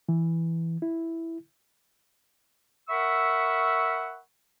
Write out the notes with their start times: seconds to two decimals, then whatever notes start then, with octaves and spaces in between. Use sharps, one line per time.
0.09 E3
0.82 E4
2.89 A#4 E5 F#5 B5 C#6 E6